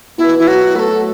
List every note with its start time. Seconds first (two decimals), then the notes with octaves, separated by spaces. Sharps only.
0.18 B2 E4
0.39 E4
0.47 F#3 F#4
0.75 A3 B4
0.80 A4